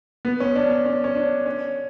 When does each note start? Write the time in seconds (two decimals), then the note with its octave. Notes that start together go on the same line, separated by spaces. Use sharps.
0.25 B3
0.40 C#4
0.56 D4
0.70 C#4
0.85 C#4
1.04 C#4
1.15 D4
1.46 C#4